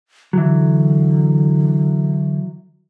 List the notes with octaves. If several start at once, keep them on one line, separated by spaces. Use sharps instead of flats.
D3 E3 F#3